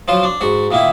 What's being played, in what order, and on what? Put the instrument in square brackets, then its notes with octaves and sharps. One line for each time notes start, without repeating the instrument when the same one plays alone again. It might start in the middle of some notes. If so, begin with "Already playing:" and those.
[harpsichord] F3 F#3 F4 C5
D4
G#2 F#4
A#2 D#3 A#3 E4